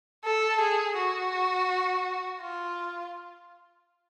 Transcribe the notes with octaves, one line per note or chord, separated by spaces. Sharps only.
A4
G#4
F#4
F4